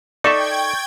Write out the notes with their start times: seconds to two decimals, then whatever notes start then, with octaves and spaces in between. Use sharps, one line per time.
0.24 D#4 A4 D5 E5 G5 C#6 G#6